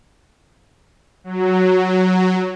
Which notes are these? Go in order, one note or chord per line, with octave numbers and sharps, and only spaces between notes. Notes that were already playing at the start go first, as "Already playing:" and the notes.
F#3